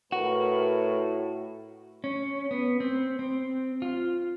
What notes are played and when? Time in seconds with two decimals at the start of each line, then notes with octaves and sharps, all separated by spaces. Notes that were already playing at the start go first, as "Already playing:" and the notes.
0.12 A2 F#4 A#4 B4
2.04 C#4
2.51 B3
2.80 C4
3.19 C4
3.82 F4